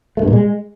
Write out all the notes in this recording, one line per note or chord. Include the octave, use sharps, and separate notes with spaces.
A3
G2
A#2
G#3